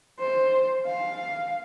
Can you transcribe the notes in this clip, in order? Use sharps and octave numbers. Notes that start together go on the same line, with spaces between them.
C5
F5